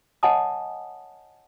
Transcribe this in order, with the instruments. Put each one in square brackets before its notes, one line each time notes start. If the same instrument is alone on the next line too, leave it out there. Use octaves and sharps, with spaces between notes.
[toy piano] C#5 D#5 F#5 G#5 A5 D#6